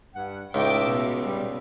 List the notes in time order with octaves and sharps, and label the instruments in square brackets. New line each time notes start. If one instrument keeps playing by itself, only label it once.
[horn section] G2 F#5
[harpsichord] C#2 [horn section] A2 D#4 E5 [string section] G5 D6
[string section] B2
[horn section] G3